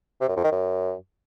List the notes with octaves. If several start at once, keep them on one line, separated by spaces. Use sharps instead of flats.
C3
F#2
F2
D#3
F#2